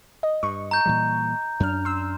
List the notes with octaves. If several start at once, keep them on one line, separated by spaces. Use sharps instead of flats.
D#5
G2 C#6
A#5 G6
A#2 E3 G3
F#2 D4 F6
C6 E6